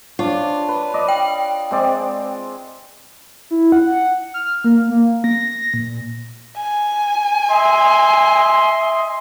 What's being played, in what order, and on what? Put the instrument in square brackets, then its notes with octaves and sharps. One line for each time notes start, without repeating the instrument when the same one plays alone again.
[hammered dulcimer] D4 C#5 [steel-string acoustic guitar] F4
[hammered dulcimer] B4
D5 D#5
[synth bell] G5
[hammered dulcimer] G#3 C4 D5
[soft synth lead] E4
F#5
F6
A#3
A#3
A#6
A#2
[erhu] G#5
[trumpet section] D#5 E5 C6